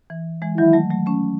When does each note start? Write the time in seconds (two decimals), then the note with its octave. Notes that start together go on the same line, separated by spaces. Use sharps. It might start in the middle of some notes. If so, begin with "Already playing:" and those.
0.10 E3
0.42 E3 G#3
0.58 D#3 F#3 E4
0.73 F#3 A3
0.91 F#3 A3
1.06 A3 C#4